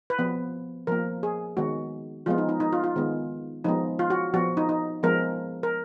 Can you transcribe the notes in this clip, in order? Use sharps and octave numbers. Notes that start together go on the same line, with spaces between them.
B4
F3 B3
F3 A#3 A#4
G#4
D#3 G#3 B3 F#4
F3 G#3 B3 F4
D#4
D#4
D#4
F4
F4
D#3 G#3 B3
F3 G#3 B3 D#4
F4
F#4
F3 B3 F#4
D#4
D#4
F3 G#3 B3 A#4
A#4